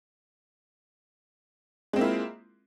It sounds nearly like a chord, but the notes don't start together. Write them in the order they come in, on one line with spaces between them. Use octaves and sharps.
G#3 C4 A#3 E4 F4